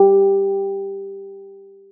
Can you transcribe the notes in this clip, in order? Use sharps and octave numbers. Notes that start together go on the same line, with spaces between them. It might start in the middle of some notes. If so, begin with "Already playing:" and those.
Already playing: G4